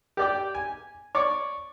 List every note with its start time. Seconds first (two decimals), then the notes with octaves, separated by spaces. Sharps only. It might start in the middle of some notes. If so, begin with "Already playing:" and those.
0.17 G4 D5 G5
0.55 G#5
1.15 C#5 D5